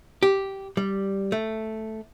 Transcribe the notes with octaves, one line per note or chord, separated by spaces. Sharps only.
G4
G3
A3